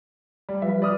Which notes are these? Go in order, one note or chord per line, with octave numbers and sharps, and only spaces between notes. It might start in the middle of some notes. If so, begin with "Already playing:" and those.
G3
F3 G3 B4 E5
D5 D#6 F6